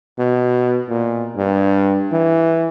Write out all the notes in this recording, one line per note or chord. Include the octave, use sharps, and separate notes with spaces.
B2
A#2
G2
E3